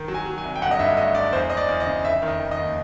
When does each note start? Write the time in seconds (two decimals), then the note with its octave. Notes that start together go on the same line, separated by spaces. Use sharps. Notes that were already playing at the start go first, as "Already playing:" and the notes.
Already playing: D#3
0.08 F#3
0.14 G#5
0.26 F#3
0.38 G#5
0.43 C2
0.56 G5
0.61 G1 F#5
0.71 D#5
0.79 G2 E5
0.97 A3 D#5
1.15 G1 D5
1.33 E2 C5
1.50 E2 D#5
1.57 D5
1.68 E2
1.80 D#5
1.87 C#3
2.05 F1 E5
2.22 D#3
2.28 D#5
2.40 D#3
2.51 D#5
2.58 D#2